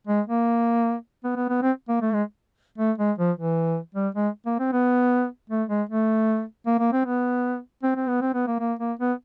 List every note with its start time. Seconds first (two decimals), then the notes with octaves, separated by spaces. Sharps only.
0.07 G#3
0.27 A#3
1.24 B3
1.36 B3
1.49 B3
1.62 C4
1.89 A#3
2.02 A3
2.13 G#3
2.78 A3
2.98 G#3
3.18 F3
3.37 E3
3.95 G3
4.15 G#3
4.46 A#3
4.59 C4
4.72 B3
5.50 A3
5.69 G#3
5.89 A3
6.66 A#3
6.79 A#3
6.92 C4
7.05 B3
7.83 C4
7.96 C4
8.09 B3
8.21 C4
8.34 B3
8.47 A#3
8.60 A#3
8.79 A#3
8.99 B3